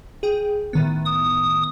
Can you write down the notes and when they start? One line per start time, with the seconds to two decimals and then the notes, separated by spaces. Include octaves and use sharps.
0.23 G#4 G5
0.73 A2 D#3 B3
1.05 D#6